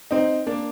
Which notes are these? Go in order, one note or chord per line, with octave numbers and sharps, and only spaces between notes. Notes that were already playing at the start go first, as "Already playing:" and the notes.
C4 D#4
A#3 D4